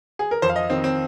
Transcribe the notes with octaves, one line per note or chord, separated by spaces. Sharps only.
G#4
A#4
F2 C5
F5
D#5
D#3 C4
C4